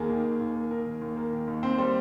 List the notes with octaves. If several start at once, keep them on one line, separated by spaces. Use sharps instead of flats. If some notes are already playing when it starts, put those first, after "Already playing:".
Already playing: D#2 A#3 G#4
D#3
D#2
D#2
A#3
D#3 A#4
D#2
D#2
A#3
D#3
D#2
C4 C5
G3 C5